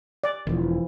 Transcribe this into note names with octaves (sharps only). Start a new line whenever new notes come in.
D5
E1 E3 F3